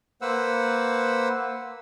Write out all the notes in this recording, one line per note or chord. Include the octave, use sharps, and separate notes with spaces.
A#3 B4 C5 F#5 E6